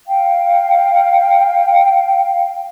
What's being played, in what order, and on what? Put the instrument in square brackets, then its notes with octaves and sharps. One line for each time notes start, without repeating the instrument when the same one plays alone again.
[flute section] F5 G5